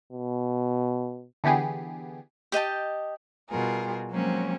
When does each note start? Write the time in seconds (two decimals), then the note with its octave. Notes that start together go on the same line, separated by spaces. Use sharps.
0.12 B2
1.44 D3 E3 B3 G4 G#4
2.52 G4 D#5 G5 A5
3.49 B2 G3 F4 G#4 A#4
4.11 F3 F#3 G#3 A#3 C4 C#4